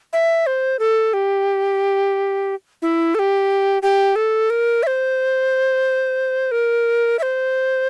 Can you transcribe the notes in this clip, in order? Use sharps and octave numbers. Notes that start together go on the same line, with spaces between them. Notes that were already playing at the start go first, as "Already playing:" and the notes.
E5
C5
A4
G4
E4
A4
G4
G4
A4
A#4
E5
C5
A#4
E5
C5